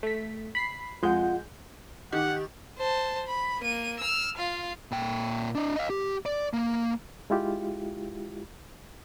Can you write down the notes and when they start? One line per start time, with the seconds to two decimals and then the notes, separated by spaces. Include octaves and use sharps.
0.03 A3 B6
0.55 B5 B6 C7
1.03 F2 G#3 F4 F#5 G6
2.12 D#3 G4 F#5
2.78 C5 A5
3.28 B5
3.60 A#3 D#7
4.00 E6 F6
4.37 F4 F5
4.91 A#2 G5
5.55 D4 D#5
5.76 D#5 F5
5.90 G4
6.26 D5
6.53 A#3
7.30 G#3 E4 F4 G4